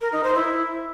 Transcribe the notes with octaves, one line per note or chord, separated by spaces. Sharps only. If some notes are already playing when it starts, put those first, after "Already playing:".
A#4
D#4
C5
E4